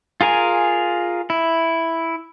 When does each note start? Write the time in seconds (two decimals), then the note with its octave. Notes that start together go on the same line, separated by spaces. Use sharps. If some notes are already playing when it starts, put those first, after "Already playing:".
0.21 F4 G#4 A#4 G#5
1.30 E4